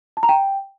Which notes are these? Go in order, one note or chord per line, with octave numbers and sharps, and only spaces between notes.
A5
A#5
G5